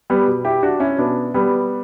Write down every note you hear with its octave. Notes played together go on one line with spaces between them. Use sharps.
G3 B3
B2
E4 G4
D4 F#4
C#4 E4
B2 B3 D4
G3 B3